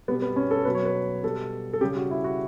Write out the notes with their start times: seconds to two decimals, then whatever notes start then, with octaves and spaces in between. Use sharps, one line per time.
0.08 B2 G3 B3
0.22 B3
0.36 C#4
0.51 A4
0.65 B2 F#3 B4
0.75 C#5
0.85 B4
1.23 B2 G3 A4
1.73 A4
1.81 C#3 G3 G4
1.96 F#4
2.11 E4
2.24 F#4